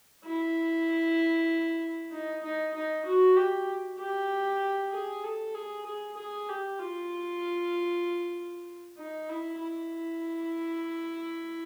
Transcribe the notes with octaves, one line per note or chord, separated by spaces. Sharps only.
E4
D#4
D#4
D#4
F#4
G4
G4
G#4
A4
G#4
G#4
G#4
G4
F4
D#4
E4
E4